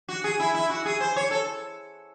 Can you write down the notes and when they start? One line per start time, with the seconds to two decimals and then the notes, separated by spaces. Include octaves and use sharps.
0.09 F#4
0.24 G#4
0.40 E4
0.55 E4
0.70 F#4
0.85 G#4
1.00 C5
1.16 C#5
1.31 A4